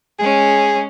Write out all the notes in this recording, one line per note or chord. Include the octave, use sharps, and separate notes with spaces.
G#3 C#4 G#4